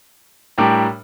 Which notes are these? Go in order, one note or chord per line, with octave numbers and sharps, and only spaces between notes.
A2 G3 D4 G4 A#4